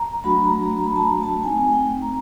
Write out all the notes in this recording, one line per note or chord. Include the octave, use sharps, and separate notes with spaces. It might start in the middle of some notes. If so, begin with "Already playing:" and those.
Already playing: A#5
F#3 A3 D4 F#4 B5
A#5
A#5
B5
A5
A#5
A5
A3 C4 D#4 G#5
G#5
G5
A#5